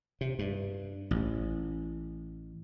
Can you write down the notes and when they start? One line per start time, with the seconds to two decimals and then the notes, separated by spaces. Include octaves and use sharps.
0.21 C3
0.39 G2
1.11 A1